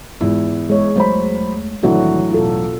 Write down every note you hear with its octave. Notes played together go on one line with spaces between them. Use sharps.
E2 G#2 E4 F4
G#3 C#5
E2 F#3 A3 C5 B5
C2 A2 D#3 E3 F#3 D4 F#4
B1 E2 F4 A4